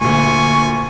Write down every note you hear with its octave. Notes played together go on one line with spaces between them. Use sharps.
D2 A#2 G#5 C#6